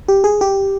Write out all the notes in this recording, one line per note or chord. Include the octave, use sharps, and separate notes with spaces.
G4
G#4
G4